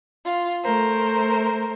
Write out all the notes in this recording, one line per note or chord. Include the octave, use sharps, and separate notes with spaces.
F4
A3 A#4 C5